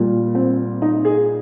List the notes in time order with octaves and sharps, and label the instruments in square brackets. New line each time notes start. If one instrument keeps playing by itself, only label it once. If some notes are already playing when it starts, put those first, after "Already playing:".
Already playing: [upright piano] A#2 G3
C4
D#4
G#4